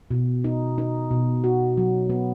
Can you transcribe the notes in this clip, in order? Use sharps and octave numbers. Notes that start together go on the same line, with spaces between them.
B2
D#4
D#4
B2
F#4
F#3
B3